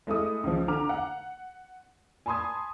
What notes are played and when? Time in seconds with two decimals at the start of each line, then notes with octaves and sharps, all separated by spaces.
0.07 G#3 A3 E4 D#6
0.44 C#2 F3
0.68 D3 A#5 D6 F6 F7
0.89 F#5
2.26 G#5 A5 B5 C6 D#6 G#6